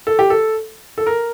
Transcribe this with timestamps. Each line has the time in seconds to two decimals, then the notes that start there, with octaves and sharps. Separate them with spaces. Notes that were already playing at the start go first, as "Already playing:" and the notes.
0.07 A4
0.19 G4
0.30 A4
0.98 A4
1.07 A#4